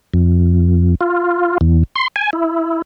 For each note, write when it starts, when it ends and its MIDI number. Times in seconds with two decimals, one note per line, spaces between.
0.14 0.95 41
1.01 1.58 65
1.61 1.83 40
1.96 2.08 84
2.16 2.30 80
2.33 2.82 64